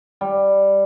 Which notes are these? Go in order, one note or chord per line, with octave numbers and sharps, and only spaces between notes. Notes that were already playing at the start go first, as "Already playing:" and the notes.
G3